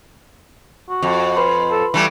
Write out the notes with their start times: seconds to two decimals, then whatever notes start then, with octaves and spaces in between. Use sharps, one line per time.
0.89 F#4
1.02 F2
1.36 B4 B5 C6
1.71 A4
1.94 E3 G3 A3